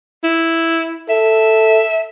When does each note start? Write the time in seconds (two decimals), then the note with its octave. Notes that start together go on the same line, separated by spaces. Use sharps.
0.23 E4
1.09 A4 E5